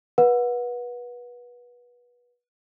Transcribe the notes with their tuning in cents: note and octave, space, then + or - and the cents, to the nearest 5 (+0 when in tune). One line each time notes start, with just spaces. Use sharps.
B4 -25 F#5 -25